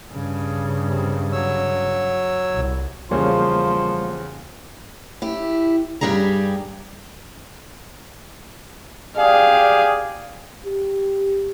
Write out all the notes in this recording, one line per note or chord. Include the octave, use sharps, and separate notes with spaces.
G2 C#3
C3
F#3 C#5 E6
C2
E2 C#3 F3 G3 A#3 C5 C#5
E4 G4
G2 G3 G4 G#4 A#5
G4 G#4 D5 F5
G4